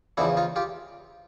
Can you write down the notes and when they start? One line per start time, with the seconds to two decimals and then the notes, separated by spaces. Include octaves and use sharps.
0.17 E2 C#3 F3 D4 E4
0.37 D#4 F4
0.56 F4 G4